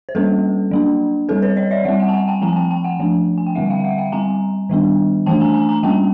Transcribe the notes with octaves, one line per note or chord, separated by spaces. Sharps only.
C5
G3 A#3 C#4 A4 B4
F#3 A#3 D4
G3 C4 A4 B4
B4 C#5
C#5 D#5
D5 E5
G3 C4 E5 F#5
F#5 G#5
A5
F#5 G#5
G5 A5
F3 G#3 C4 G#5 A#5
G5 A5
G5 A5
F#5 G#5
F3 A3 D4
G#5
G5
D3 G3 C4 E5 F#5
F5 G5
F5
E5 F#5
F5 G5
G3 C4 G#5 A#5
D#3 G3 B3 D4
E3 A3 D4 G5 A5
G#5 A#5
G#5 A#5
G#5 A#5
G3 A#3 C#4 G5 A5